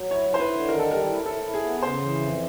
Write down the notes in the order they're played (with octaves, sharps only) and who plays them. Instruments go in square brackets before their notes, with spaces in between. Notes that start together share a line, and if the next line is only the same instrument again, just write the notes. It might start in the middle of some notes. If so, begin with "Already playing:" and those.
Already playing: [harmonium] F#3
[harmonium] E4 [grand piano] C#5
[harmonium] E4 [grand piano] C5
[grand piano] B4
[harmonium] D3
[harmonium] D#3 [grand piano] A#4
[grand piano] A4
[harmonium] G3 [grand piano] A#4
[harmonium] E4
[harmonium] E4 [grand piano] A4
[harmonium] E4
[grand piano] G#4
[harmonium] B3
[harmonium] C#3 [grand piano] C5
[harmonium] E3
F2